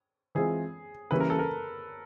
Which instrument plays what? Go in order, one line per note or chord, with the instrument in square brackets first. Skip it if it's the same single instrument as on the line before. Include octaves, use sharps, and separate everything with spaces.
[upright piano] E3 G#3 C4 F4 [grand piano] G#4
[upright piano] C#3 E3 G3 A#3 C#4 [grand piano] B4
[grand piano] A#4
A4
A#4